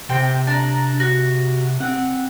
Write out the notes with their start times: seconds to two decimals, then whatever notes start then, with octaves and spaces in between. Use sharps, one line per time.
0.09 C3 C4 G5
0.47 D4 A#5
1.00 F#4
1.80 C4 F#5